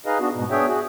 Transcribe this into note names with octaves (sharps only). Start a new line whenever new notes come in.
D#4 G#4 B4 D#5 F5
B3 D4 F#4
G#2 B2
B3 D4 G#4 C#5 E5 G5
F#4 G#4